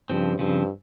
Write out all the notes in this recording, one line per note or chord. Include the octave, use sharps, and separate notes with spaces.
G2 C#3 F3 C4
G2 C#3 F3 C4